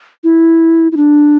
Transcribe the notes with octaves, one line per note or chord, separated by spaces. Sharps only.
E4
E4
D4